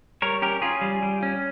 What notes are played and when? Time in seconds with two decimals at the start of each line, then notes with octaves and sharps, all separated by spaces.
0.22 G3 A#4 C#5
0.42 C#4 G4 A#4
0.62 C#4 F4 G#4
0.81 G3
1.02 G3
1.23 C#4